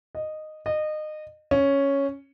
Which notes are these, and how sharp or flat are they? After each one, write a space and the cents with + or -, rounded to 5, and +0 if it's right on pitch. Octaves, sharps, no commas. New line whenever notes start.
D#5 -10
D#5 -25
C#4 +0